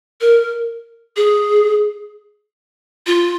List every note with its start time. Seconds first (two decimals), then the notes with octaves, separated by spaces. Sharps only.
0.21 A#4
1.16 G#4
3.07 F4